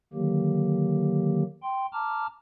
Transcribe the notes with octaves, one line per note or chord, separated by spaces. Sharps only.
D3 D#3 F#3 A#3 G4
G5 C6
A5 A#5 D6 F6